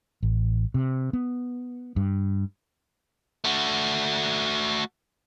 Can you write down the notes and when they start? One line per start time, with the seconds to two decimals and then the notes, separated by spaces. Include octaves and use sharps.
0.23 A1
0.74 C3
1.13 B3
1.96 G2
3.44 A3 F#4